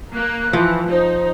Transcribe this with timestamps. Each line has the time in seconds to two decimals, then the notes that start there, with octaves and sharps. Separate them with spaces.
0.14 A#3 F#6
0.53 E3 F3
0.91 D#4 C5